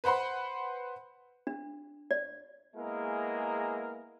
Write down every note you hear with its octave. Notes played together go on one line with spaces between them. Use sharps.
B4 C5 F#5 B5 C6
D4
D5
G#3 A#3 B3 E4 G#4 A#4